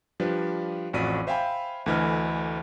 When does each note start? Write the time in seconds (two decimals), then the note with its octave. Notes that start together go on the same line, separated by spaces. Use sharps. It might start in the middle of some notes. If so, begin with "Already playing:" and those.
0.20 F3 G3 D4 B4
0.93 A1 F2 F#4 D5 B6 D#7
1.27 C5 E5 F5 G5 G#5 B5
1.86 D2 D3 E3 D#5 B5 F6